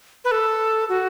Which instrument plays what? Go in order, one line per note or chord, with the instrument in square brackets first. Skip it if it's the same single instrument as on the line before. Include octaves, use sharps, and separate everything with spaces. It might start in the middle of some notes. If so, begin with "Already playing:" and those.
[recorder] B4
A4
F#4